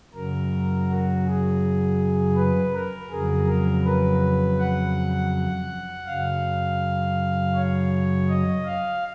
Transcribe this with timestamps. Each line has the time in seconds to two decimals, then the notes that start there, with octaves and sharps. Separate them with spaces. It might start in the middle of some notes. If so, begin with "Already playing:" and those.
0.15 F#2 C#3 F#3 A#4
0.88 F#4
1.26 G#4
2.36 B4
2.73 A#4
3.10 F2 C#3 F#3 G#4
3.47 A#4
3.85 B4
4.58 F#5
6.07 F#2 C#3 F#3 F5
7.55 C#5
8.29 D#5
8.66 F5